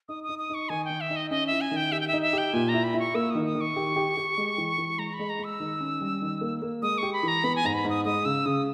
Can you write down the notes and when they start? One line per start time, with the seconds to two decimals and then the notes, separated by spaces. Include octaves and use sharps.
0.09 D#4 D#6
0.24 D#6
0.29 D#4
0.39 D#6
0.50 D#4 C#6
0.69 D#3 G#5
0.85 G5
0.90 D#3
1.01 E5
1.10 D#4
1.16 D#5
1.31 C#4 D#5
1.47 E4 E5
1.61 G#5
1.71 D#3 G5
1.92 G4 E5
2.00 G5
2.08 E5
2.13 D#4
2.22 E5
2.33 G4 G5
2.53 A#2 G#5
2.69 A#5
2.74 E4
2.84 B5
2.94 E4
2.99 C#6
3.15 A#3 E6
3.30 D#3 D#6
3.45 D#6
3.55 D#3
3.61 C#6
3.76 G4
3.96 G4
4.17 G4
4.37 G#3
4.58 E3
4.78 E3
4.98 G#3 A#5
5.14 B5
5.19 G#3
5.30 A#5
5.39 G#3 E6
5.60 D#3
5.80 C#4
6.01 G3
6.22 D#3
6.41 A#3
6.62 A#3
6.82 G#3 D#6
6.98 G4 C#6
7.13 B5
7.23 E3 A#5
7.44 B3 B5
7.56 G#5
7.64 G#2 A#5
7.74 B5
7.85 G#2 D#6
8.05 G#3 D#6
8.25 C#3 E6
8.46 C#3 D#6